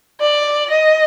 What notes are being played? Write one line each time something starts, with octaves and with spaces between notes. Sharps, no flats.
D5
D#5